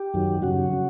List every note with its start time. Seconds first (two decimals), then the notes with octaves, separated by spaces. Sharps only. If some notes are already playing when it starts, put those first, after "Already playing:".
Already playing: G4
0.14 F#2 D#3 F#3
0.42 F#2 C#3 F#3 F#4
0.72 C#3 F#3